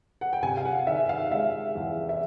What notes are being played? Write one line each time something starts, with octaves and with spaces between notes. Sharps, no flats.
F#5
G5
C3 G#5
F5
F#5
D#3 E5
F5
G#3 E5
E2
E5